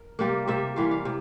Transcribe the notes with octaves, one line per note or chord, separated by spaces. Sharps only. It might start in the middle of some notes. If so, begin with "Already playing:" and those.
Already playing: A#4
C3 G3 A#3
C3 G3 A#3 E5
C3 E3 G3 A#3 F5
F5
C3